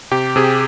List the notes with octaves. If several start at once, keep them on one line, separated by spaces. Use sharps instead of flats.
C3 G4
C3 G#4